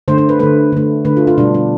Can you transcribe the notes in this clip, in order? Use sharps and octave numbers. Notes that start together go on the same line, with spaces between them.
D3 A3 C5
C5
B4
D3 A3 B4
D3 A3
D3 A3 B4
F4
F4
B2 G3 D4
D4